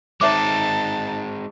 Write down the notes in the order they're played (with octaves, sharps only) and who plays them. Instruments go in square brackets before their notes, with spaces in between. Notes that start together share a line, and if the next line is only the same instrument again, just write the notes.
[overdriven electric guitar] G#3 C4 [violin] D#4 A5 [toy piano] C#5 E5 D6